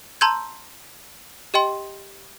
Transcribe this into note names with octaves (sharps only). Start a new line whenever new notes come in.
A5 A#5 C6 E6 G6 G#6
G4 D#5 G5 C6